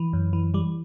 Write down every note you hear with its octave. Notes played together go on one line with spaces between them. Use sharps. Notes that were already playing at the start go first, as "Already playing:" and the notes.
Already playing: E3
F#2
E3
E3 G3